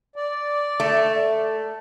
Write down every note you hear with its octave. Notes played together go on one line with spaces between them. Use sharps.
D5
A3